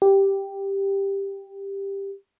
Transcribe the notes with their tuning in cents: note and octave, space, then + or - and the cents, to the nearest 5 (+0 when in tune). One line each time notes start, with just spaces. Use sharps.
G4 +5